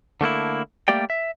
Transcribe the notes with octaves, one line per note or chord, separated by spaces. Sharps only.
D3 A3 A#3 E4
G3 A3 A#3 G4 D5 G5
E5